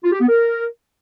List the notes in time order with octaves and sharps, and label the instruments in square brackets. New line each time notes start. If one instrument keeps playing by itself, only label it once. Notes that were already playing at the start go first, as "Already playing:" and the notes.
[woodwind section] F4
G4
B3
A#4